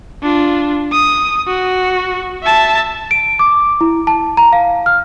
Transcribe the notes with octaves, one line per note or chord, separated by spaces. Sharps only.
D4 F4
D#6
F#4
E5 A5
D7
D6
E4
A5
A#5
F5
F6